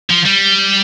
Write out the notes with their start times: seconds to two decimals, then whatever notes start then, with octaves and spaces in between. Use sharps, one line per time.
0.10 F3
0.25 G3